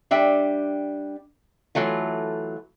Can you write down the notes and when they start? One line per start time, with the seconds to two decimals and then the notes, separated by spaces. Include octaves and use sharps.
0.11 G3 D4 E5 G5
1.75 E3 F#3 A3 F4